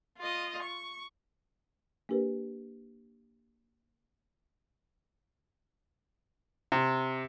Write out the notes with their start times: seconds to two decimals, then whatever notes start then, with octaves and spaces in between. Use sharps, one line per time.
0.18 F4 D#5
0.63 C#6
2.09 A#3 D4 G4 A#4 B4
6.72 C3